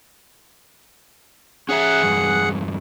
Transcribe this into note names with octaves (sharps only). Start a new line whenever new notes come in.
C#4 G#4 C#5 E5 F#5 F#6
E2 G2